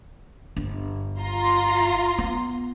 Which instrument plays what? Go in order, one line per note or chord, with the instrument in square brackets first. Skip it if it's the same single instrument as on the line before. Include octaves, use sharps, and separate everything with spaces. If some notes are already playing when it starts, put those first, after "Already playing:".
[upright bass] G1
[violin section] F4 A#5 C6
[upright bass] B3